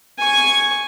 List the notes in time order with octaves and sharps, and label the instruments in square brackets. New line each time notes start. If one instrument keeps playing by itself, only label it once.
[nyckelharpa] G#5 C#6